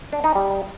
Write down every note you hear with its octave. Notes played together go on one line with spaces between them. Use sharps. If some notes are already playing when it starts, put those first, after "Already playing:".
D4
D#4
G3